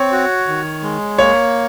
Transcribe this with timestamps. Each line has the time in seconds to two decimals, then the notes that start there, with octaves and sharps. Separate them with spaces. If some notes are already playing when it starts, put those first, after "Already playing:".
Already playing: C4 C#5
0.12 F#4
0.48 D#3
0.83 G#3
1.18 A#3 C#5